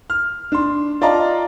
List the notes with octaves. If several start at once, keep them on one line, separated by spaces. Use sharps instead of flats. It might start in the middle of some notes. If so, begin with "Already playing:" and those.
F6
D4 C6
F4 D5 D#5 F5 A5 A#5